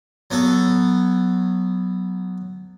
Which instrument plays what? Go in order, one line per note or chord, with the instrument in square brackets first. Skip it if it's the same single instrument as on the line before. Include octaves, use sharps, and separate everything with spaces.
[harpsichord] F#3 B3 F#4 A4